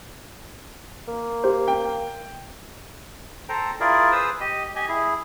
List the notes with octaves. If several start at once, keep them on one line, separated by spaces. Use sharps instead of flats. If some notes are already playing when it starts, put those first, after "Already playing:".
A#3
G4 C5
G5
A4 C5 G5 A#5
E4 F4 G#4 A#4 D5
G#4 B4 C5 D#6 E6
G4 D#5
G4 D#5 G#5
E4 G#4